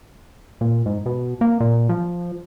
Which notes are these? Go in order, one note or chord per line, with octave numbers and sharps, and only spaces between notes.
A#2
G#2
B2
A#3
A#2
F3